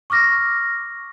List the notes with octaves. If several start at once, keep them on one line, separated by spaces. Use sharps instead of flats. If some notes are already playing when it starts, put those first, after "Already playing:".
C#6 D6 F6 A#6